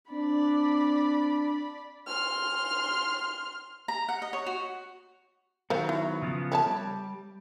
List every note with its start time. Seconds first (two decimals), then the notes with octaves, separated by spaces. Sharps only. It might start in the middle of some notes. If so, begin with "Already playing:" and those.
0.11 C4 D4 D5 B5
2.07 C6 F6
3.88 A#5
4.09 F#5
4.22 D#5
4.33 C#5
4.46 F#4
5.70 D#3 F#3 B3 A#4 C5 F5
5.89 E4
6.22 C#3 F3 B3
6.52 C4 C#5 A5
6.66 G3